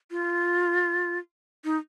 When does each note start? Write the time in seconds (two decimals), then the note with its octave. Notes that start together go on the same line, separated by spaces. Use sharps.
0.11 F4
1.65 D#4